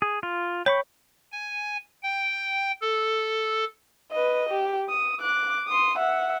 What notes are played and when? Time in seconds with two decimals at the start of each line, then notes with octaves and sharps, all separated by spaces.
0.02 G#4
0.23 F4
0.66 C#5 G5 B5 C#6
1.32 G#5
2.03 G5
2.81 A4
4.11 B4 D#5
4.49 G4
4.89 D#6
5.21 D6 F#6
5.68 C6 D#6
5.99 E5 F#5